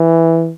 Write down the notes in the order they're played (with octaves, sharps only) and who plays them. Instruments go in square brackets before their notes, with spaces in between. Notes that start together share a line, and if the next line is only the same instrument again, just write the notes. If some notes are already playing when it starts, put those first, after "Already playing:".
Already playing: [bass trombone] E3